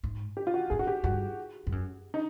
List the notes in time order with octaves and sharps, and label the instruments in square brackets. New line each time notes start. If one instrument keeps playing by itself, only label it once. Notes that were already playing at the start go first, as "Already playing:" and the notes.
[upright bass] G#2
[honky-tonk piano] G4
F4
F#4
[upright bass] G#2 [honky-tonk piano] G#4
[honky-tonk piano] F#4
G4
[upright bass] G2 [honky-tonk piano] F#4
[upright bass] G2
F#2
[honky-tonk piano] D#4